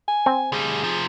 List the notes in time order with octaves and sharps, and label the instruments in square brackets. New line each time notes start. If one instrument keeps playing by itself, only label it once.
[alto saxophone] G#5
[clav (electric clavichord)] C4
[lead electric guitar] D2 G3 [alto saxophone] G#4
[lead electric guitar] C3 F3